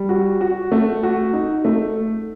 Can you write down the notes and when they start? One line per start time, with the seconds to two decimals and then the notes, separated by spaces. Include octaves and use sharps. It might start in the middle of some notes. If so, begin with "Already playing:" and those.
Already playing: G3
0.09 F#4
0.41 F#4
0.72 A3
1.03 F#4
1.33 D#4
1.65 A3